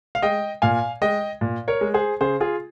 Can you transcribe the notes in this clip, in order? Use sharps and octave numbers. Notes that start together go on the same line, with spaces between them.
F5
G#3 D#5 G5
A#2 F5 G#5
G#3 D#5 G5
A#2
A#4 C#5
G#3
G#4 C5
C#3 G#4 C5
F4 G#4